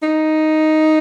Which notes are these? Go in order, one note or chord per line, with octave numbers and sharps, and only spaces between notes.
D#4